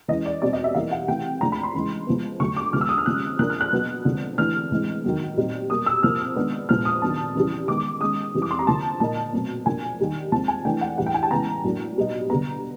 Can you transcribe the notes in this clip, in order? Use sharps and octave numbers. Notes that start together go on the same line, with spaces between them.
E3 G#3 C#4 D#5
D5
B2 G3 C4 D#4 D5
D#5
E5
E3 G3 A#3 D#4 F5
F#5
C3 E3 A3 G5
F3 A3 D4 A#5
B5
C6
C#3 E3 G#3
F3 G#3 B3
D3 F#3 A3 C#6
D6
D3 F3 G#3 B3 F6
E6
D#6
F6
C3 F3 G#3 C#4 F#6
F3 A#3 D4 F#6
F6
F#6
B2 F#3 B3 D#4
D3 F3 G#3 C4
C3 E3 A3 D4 F6
A2 E3 G#3 C4
D#3 F#3 B3
A#2 G3 C4 D#4
B2 G3 A#3 D#6
E6
C3 F3 A#3 F6
D#3 G#3 B3 D4
A#2 F3 G#3 B3 F6
D#6
C3 D#3 F#3 B3 D4 A5
C#3 E3 G3
D#3 G#3 B3 D6
D#3 G#3 C#4 D#6
C3 E3 G3
D6
C6
A#5
D3 F3 A#3 A5
A#2 F3 A#3 D#4 A5
B2 F#3 A3 C4
F3 A#3 D4 G#5
D#3 G3 A#3
F3 G#3 C4 A5
G#5
E3 A3 D4 G5
F#5
A2 E3 G3 F#5
G5
G#5
A5
C#3 E3 G#3 B3 A#5
A2 F#3 A#3 D4
B2 G3 B3 D#4
D3 G3 B3 A#5